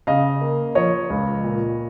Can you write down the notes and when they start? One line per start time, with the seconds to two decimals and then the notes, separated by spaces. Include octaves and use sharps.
0.07 C#3 D#5 F5
0.41 A#3
0.75 F3 C#5 D#5
1.10 C#2
1.44 A#2